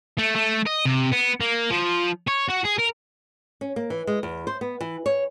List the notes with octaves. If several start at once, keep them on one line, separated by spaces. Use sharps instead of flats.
A3
A3
D#5
C3
B3
A#3
F3
C#5
F#4
G#4
A#4
C#4
A#3
E3
G#3
E2
C5
B3
E3
C#5